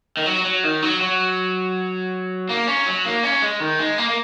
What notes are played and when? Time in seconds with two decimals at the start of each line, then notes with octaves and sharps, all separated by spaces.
0.17 D#3
0.26 F#3
0.45 F#3
0.64 D#3
0.82 F#3
1.01 F#3
2.49 A#3
2.67 C#4
2.87 F#3
3.05 A#3
3.23 C#4
3.42 G#3
3.60 D#3
3.79 G#3
3.98 A#3
4.08 A#3